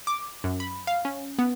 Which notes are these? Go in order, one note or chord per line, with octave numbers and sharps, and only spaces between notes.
D6
F#2
B5
F5
C#4
B3